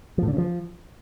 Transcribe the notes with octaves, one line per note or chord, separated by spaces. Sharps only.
F3
A2
D3
C#3
F3